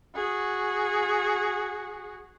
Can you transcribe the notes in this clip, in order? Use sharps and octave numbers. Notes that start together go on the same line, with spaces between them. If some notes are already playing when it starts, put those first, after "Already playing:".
F#4 G#4